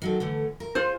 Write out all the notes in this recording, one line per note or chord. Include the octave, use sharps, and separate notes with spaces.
D#3 F#3 A4
D3 E3 A3
A#4
F4 G#4 C5